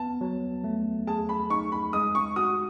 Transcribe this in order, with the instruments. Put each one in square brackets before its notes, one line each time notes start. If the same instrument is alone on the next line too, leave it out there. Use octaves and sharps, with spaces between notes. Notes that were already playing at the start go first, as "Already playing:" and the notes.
Already playing: [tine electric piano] B3 [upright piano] A5
[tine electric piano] F#3
A3
[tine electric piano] G#4 [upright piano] A5
[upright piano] B5
[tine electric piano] D#4 [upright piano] C#6
[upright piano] B5
[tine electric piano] G#3 [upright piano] D#6
[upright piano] C#6
[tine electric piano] F#4 [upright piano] D#6